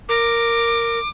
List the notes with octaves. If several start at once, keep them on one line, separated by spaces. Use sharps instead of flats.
A#4 D6